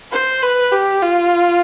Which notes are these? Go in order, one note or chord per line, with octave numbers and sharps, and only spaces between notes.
C5
B4
G4
F4